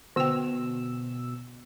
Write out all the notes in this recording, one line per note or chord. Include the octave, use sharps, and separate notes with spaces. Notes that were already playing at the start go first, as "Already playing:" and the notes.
B2 D3 G5 E6